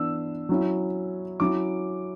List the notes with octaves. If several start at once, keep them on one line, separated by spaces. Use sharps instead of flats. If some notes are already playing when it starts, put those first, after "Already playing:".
Already playing: E3 B3 D4 E6
F#3 C#4 E4
F#3 C#4 E4 D6